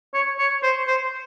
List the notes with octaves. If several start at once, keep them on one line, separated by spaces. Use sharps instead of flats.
C#5
C#5
C5
C5